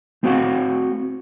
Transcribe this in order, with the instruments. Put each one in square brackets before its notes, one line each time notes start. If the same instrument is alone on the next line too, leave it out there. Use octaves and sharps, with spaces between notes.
[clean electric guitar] A3 C4 F#4 C5 F5 F#5